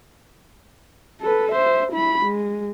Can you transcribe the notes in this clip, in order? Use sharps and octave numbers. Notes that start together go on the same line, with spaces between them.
A4 B4
C5 E5
E4 B5
G#3